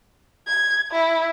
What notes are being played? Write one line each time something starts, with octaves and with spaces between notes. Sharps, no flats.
G#6
E4